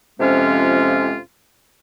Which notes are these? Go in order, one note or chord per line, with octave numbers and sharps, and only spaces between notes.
F2 C3 F3 G#3 C#4 F4